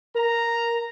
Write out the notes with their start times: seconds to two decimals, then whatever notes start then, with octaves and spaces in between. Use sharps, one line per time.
0.15 A#4 A#5